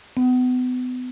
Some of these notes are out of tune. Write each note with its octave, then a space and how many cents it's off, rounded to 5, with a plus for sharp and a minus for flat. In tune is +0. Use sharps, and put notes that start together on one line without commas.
B3 +30